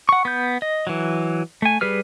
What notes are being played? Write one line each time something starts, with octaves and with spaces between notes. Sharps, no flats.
F#5 C#6
B3 G6
D#5
E3 F#3
A3 G#5
G3 G#4 B4 F6